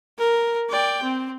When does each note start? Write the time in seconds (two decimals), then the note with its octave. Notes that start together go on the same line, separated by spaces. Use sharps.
0.18 A#4
0.70 D5 G5
1.03 C4